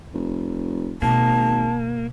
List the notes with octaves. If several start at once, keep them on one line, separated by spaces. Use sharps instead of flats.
F1
G#1 B2 A#3 A5